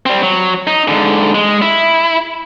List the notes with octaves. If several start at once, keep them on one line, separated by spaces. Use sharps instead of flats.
G3 C4
F#3
D#4
G#2 D3
G#3
E4